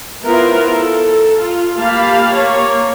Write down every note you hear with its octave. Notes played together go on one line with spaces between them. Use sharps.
B3 E4 F4 A#4 C5
A4
F4
A#3 G4 F5 A5 B5
A#3 C#5